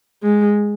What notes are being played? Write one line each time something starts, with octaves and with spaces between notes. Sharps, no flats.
G#3